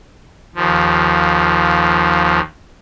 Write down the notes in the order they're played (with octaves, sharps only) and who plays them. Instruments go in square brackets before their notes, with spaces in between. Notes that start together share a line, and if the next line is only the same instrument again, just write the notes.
[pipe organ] D#2 F3